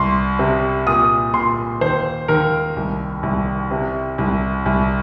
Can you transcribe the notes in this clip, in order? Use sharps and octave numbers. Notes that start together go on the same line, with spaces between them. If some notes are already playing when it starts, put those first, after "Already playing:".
Already playing: C2 C6
C3
A#2 D#6
A#2 C6
D#2 C5
D#2 A#4
C2
C2
C3
C2
C2